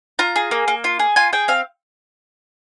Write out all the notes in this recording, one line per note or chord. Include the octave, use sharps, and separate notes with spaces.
F4 A#5
G#4
A#3
A#3
F4
G#4
F4 G#5
G#4 G5
C4 F5